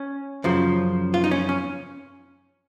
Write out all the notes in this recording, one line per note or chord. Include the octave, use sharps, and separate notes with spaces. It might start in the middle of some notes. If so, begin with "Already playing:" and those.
Already playing: C#4
F#2 C#3 F3
F4
D#4
C#4
C#4